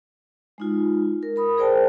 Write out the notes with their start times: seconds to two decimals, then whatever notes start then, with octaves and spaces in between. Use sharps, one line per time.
0.58 G#3 D#4 F4
1.23 A#4
1.36 A#4 B5 D#6
1.57 G#4 A#4 C5 D5 G5 A5